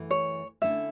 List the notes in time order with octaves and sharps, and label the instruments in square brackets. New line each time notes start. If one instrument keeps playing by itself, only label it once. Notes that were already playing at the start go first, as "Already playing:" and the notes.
Already playing: [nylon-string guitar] F#2 E3 A3
[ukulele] C#5
[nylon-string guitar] D3 A3 C#4 E4 [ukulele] E5